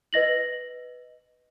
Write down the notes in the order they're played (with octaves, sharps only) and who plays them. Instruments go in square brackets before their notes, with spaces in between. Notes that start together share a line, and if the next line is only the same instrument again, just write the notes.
[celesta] B4 D#5 A#6 F#7